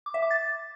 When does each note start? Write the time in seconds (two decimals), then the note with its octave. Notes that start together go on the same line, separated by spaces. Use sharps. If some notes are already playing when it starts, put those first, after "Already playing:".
0.06 D6
0.14 E5
0.22 D6
0.31 A6